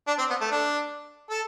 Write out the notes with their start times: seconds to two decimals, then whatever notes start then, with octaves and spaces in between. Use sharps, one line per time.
0.07 D4
0.18 C4
0.30 B3
0.41 A3
0.51 D4
1.30 A4